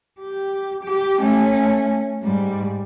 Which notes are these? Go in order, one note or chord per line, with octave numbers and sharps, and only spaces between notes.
G4
G4
A3 C#4
G#2 G3